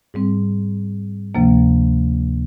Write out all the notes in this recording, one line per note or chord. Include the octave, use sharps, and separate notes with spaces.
G#2 G3 C4
D2 C3 F3 A#3